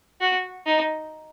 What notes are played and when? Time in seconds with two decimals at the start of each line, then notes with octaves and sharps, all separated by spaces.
0.21 F#4
0.66 D#4